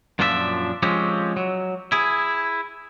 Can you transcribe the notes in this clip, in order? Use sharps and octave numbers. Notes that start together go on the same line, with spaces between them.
F#2 A#2 F3 D4 A4 E5
F3 G#3 C4 C#4 G4
F#3
E4 G#4